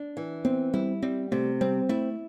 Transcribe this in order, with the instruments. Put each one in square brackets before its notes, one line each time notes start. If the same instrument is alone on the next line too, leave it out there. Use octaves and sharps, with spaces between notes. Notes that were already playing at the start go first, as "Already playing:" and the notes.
Already playing: [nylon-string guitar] D4
E3
[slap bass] B3 [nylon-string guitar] C4
[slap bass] G3 [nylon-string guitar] E4
[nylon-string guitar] G3 [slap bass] C4
[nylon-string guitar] C3 [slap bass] A3
[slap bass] G3 [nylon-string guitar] C4
[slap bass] A3 [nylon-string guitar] E4